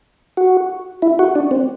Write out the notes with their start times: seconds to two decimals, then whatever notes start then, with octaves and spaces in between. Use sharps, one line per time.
0.37 F#4
1.02 E4
1.19 F#4
1.35 D4
1.51 C4